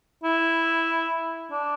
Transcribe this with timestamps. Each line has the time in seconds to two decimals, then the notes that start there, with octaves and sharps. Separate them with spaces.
0.24 E4
1.51 D4